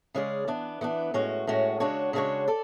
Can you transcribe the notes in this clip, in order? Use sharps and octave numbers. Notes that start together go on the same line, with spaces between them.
C#3 G#3 C#4 G#4 D5
E3 B3 D4
E3 B3 D4
A2 G#3 C#4 F#4
A2 G#3 C#4 F#4
C#3 G#3 D4 F#4 C#5
C#3 G#3 D4 F#4 C#5
A4 D5